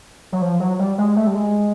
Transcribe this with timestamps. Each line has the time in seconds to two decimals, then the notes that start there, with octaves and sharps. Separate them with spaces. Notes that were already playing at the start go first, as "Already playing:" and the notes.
0.32 F#3
0.42 F3
0.60 F#3
0.79 G3
0.98 G#3
1.16 A3
1.27 G3
1.35 G#3